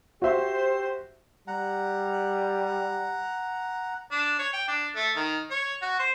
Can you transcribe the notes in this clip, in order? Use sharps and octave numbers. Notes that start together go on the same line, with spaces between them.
F#4 G4 C5 E5
G3 F#5 A#5
D4
C#5
G5
D4
A3
D#3
C#5
F#4
C5